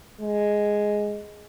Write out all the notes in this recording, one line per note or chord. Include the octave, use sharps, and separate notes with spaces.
G#3